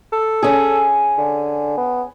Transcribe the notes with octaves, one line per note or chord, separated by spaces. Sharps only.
A4
C#4 G#4
D3
B3